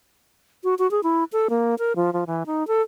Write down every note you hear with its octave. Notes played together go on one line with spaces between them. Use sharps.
F#4
F#4
G#4
E4
A4
A#3
A#4
F3
F3
E3
D#4
A4